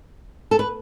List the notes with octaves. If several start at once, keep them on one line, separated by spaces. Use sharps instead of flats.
A4
B4